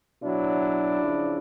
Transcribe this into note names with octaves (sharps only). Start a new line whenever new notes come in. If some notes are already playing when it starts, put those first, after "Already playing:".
B2 F#3 D4 E4
C#3 F3